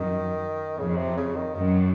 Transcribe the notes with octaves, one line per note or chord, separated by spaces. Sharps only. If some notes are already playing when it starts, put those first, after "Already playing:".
Already playing: F#2 D#3
F2 C#3
C3
C#3
D#3
F#2 D#3